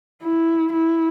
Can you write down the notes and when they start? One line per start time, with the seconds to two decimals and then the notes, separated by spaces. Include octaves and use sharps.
0.23 E4
0.72 E4